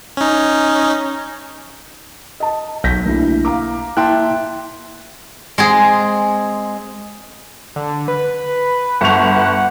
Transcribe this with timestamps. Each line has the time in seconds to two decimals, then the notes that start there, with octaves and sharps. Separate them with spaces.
0.17 C#4 D#4
2.40 D#5 A5
2.84 B1 G6 A#6 B6
3.06 D2 A#3 E4
3.45 F5 A#5 D6
3.97 A#3 E4 G5 A5 C6 F#6
5.58 G#3 C4 G#4
7.76 D3
8.08 B4
9.01 G1 F#5 C#6 F7